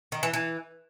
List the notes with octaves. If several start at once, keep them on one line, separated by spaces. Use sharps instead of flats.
D#3
E3
E3